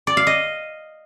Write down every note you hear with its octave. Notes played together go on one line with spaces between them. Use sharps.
D5
F5
D#5